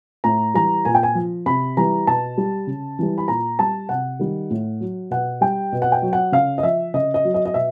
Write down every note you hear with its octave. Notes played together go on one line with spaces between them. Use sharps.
A2 A#5
E3 G3 A#5
A#2 G#5
G5
G#5
F3
C3 B5
E3 G3 A#5
B2 A5
G3
C#3
E3 G3
B5
A#2 A#5
G3 A5
C3 F#5
D#3 G3
A2
F#3
B2 F#5
G3 G5
B2
F#5
G5
F#3
F#5
C#3 F5
D#5
F3 E5
C#3 D#5
D#5
F#3
D#5
D#5
B2 E5